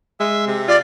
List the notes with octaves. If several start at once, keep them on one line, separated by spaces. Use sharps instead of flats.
G#3 E5
C3
F4 D5